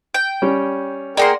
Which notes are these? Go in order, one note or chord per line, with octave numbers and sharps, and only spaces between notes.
G5
G3 C#4
A#3 F#4 G#4 A#4 D5 G5 C6